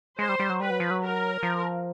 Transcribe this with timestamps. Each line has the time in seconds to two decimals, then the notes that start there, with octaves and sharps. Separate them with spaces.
0.18 G#3 C5
0.29 G3
0.39 G3
0.49 F#3
0.60 G3 B4
0.70 F#3
0.80 F3
0.90 F#3
1.02 A#4
1.43 F3